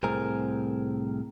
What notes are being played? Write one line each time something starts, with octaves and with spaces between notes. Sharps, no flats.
C2 A2 C4 G#4 A#4